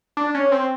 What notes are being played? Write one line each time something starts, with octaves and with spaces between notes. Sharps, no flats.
D4
C#4
C4